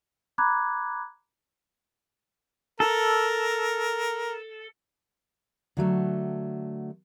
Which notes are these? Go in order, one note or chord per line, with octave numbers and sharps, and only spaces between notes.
A#5 B5 D6 F#6 G#6
A4 A#4
D3 F#3 A3